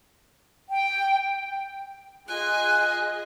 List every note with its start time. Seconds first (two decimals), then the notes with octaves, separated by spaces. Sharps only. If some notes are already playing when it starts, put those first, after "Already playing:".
0.70 G5
2.28 F4 G#4 D#5 G#5 F#6